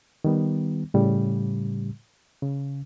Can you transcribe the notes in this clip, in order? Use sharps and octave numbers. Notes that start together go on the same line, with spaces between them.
D#3 G3 B3
A2 C#3 G3
C#3